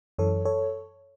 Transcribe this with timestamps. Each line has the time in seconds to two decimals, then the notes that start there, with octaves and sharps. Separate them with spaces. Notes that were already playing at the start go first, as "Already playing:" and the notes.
0.18 F#2 E3 A4 C#5
0.45 A4 C#5